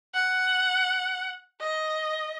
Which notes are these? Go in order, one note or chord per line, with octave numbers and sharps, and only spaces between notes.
F#5
D#5